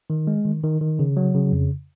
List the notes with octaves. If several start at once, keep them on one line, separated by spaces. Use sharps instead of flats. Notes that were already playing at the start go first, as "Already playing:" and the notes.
D#3
G#3
D#3
D#3
D#3
C#3
F#3
C#3
F2